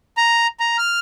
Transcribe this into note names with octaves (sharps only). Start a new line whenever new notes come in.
A#5
A#5
F6